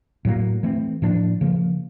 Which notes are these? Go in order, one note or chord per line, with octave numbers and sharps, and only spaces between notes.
A2 F#3 A#3
E3 A3 C4
A2 F3 A#3 D4
C#3 F3 A#3